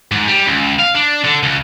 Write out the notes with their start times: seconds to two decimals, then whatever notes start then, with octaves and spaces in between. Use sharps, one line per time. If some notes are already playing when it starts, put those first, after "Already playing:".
0.12 G#2
0.28 G3
0.46 C#2
0.80 F5
0.95 D4
1.25 D3
1.43 C#2